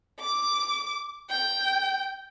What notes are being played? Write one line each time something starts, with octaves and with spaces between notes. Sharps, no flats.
D6
G5